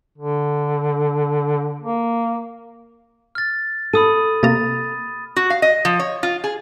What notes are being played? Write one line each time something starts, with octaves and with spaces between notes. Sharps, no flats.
D3
A#3
F6 A6
A4 B5 D#6 D#7
C3 A#3 A#5 A6
F#4
F5
D#5
F3
C#5
F4
G#4